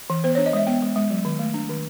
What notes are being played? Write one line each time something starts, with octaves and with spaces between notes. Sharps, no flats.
E3
B3 C5
D4 C#5
D#5
G#3 E5
B3 G5
G#3
G#3
F#3
D#3
A3
D4
D#3